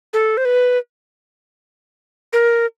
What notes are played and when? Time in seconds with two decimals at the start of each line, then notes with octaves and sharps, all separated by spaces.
0.13 A4
0.37 C5
0.45 B4
2.33 A#4